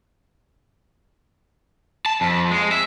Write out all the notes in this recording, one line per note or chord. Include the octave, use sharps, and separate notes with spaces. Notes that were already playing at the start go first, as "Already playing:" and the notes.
A5
F2
G#3
E5